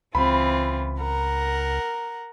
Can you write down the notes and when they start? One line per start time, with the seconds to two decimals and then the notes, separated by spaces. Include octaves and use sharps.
0.15 C#2 E3 C4 F4 B5
1.00 A#4 F#5 A#5